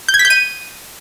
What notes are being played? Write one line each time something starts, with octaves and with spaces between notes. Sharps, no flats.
G6
G#6
B6
G6
D#7